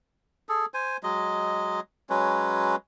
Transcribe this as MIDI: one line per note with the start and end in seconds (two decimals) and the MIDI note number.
0.49 0.66 68
0.49 0.66 69
0.74 0.97 72
0.74 0.97 80
1.03 1.80 54
1.03 1.80 56
1.03 1.80 75
2.10 2.76 54
2.10 2.76 56
2.10 2.76 61
2.10 2.76 71